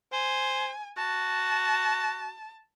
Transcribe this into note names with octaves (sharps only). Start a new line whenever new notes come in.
C5 G#5
F#4 A5